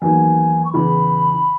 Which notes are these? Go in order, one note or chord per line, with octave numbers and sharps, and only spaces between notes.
E2 D#3 F#3 A#3 G#5
C#6
E2 C#3 E3 B5